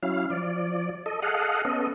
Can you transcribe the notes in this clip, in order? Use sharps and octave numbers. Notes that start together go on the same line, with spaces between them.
F#3 C#4 E4 F5
F3 D5
A4 D#5
G#4 A4 D#5 F5 F#5
B3 C#4 A4 D#5